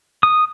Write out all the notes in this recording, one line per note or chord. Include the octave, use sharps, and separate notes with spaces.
D#6